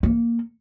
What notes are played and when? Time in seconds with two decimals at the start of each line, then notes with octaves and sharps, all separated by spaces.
0.03 A#3